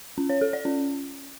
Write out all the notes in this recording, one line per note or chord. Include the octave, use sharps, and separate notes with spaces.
C#4
C#5
A4
D5
C#4